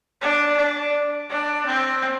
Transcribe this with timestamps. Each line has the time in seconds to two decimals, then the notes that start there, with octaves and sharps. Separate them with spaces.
0.22 D4
0.57 D4
1.30 D4
1.66 C4